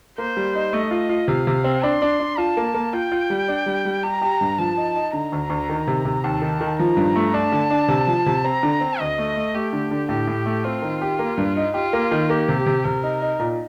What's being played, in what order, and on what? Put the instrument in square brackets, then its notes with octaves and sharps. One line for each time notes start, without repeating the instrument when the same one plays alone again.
[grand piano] A#3 [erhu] C5
[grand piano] G3
D#4
[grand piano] A3 [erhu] D#5
[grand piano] F4
F4
[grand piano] C3 [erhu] F5
[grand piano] C3
C4
[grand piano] D4 [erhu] C6
[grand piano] D4
D4
[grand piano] F4 [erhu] A5
[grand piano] A#3
A#3
[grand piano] F4 [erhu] G5
[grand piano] F4
G3
D4
G3
G3
[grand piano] G4 [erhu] A#5
[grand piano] G4
G2
[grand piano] F3 [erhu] A5
[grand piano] D#4
D#4
[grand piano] D3 [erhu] A#5
[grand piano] D2
D2
D#3
C3
C3
[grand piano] D#2 [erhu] A5
[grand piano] D#3
D#3
[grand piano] F3 [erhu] A#5
[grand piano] G2
A3
[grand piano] D4 [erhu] A5
[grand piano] D3
D4
C3
F3
C3
[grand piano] C4 [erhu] A#5
[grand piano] D3
C4
[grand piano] D2 [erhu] D#5
[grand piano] A3
A3
[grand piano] A3 [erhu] G4
[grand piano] D3
D3
[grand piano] A2 [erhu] G4
[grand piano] A2
A3
[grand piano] C4 [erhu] F4
[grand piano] D#3
G4
A#3
G2
D#4
[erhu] F4 [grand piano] G4
[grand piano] A#3
D#3
[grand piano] A#3 [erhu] G4
[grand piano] C3
C3
[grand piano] C3 [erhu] A#4
[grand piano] D#4
D#4
A#2